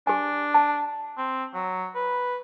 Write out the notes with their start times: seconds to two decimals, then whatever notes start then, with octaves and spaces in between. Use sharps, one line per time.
0.07 D4 G4 G#5
0.54 A5
1.17 C4
1.54 F#3
1.95 B4